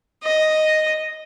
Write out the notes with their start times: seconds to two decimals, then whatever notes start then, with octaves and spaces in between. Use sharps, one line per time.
0.23 D#5